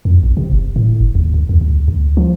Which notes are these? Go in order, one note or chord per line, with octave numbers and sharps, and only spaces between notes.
F2
A#1
C3
F#1
A2
F#1
D#2
D2
E2
D2
D2
F3